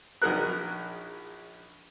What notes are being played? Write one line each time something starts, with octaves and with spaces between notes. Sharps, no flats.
A#1 D#4 F#4 G#4 A#4 F#6